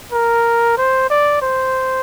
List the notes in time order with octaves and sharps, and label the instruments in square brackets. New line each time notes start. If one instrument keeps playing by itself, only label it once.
[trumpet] A#4
C5
D5
C5